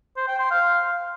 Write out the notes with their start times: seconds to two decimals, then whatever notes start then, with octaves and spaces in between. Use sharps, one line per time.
0.17 C5
0.28 G5
0.39 C6
0.51 F5